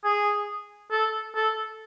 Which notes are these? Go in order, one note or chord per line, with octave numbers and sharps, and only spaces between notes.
G#4
A4
A4